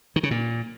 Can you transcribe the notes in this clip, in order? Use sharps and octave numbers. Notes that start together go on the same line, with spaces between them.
D#3
C#3
A#2